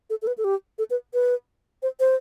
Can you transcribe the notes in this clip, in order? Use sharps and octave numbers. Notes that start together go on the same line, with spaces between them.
A4
A4
B4
A4
G4
A4
B4
B4
C5
C5